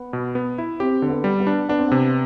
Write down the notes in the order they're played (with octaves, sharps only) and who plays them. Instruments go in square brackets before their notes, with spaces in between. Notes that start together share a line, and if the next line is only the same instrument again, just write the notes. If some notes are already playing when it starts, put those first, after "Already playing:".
Already playing: [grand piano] B3
[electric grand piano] B2
B3
E4
[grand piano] C4 [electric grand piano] G4
[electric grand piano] D3 [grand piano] C4
[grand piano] B3
[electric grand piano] G3
[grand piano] B3
[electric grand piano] D4
[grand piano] B3 [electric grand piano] D4
[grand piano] C4
[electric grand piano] C3 [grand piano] B3